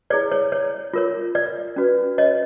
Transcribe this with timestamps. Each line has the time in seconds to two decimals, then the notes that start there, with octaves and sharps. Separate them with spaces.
0.10 E4 G#4 C#5 D5
0.31 C#5
0.52 C#5
0.93 F4 A#4 C#5
1.35 D5
1.76 C#4 F#4 B4
2.18 C#5 D#5